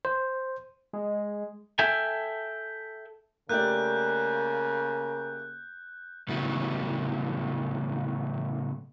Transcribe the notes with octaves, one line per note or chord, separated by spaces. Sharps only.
C5
G#3
A4 E5 G5 G#5
C#3 A3 A#3 G4 D5 F#6 G6
A2 C#3 F#3 G3 A3 B3